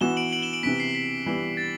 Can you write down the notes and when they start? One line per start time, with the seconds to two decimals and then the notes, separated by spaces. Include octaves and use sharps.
0.01 E3 B3 F#4 E7 G7
0.17 D7 F#7
0.33 D7 F#7
0.42 E7 G7
0.53 D7 F#7
0.63 C3 E3 B3 B6 D7
0.80 C7
0.95 B6
1.26 E3 G3 B3
1.57 A6